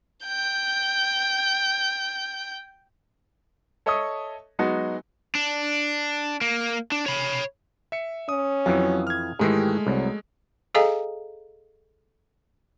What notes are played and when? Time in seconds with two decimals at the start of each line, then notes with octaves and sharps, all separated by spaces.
0.25 G5 G6
3.86 A4 C#5 D#5 E5 C#6 D#6
4.59 F#3 G#3 B3 D#4 F#4
5.35 D4
6.41 A#3
6.92 D4
7.06 C#5 B5
7.92 E5 C#7
8.29 C#4 D#6
8.66 F2 E3 F#3
9.07 F6 G#6
9.39 G#2 D#3 E3 G#3 A3 G4
9.87 C2 F#3
10.75 G#4 A4 D#5 F5 G#5 A#5